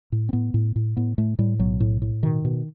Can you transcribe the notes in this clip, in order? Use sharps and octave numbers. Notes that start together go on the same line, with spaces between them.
A2
C4
A2 B3
A2
A2
A2 B3
A2 A3
A2 G3
B1 F#3
A2
A2
B2 D#3
B2